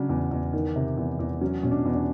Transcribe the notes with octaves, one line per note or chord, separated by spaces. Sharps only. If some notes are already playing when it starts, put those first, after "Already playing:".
Already playing: C#3 F#3 D4
E2
E2
D#3
C3
E2
E2
F#3 C#4
B2 C#4
D4
E2
D4